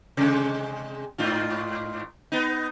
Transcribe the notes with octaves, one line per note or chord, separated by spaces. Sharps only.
C3 G#3
G#2 D#4 F4
B3 D#4